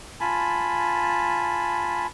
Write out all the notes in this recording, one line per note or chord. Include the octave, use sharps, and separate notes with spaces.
F4 G#5 A5 B5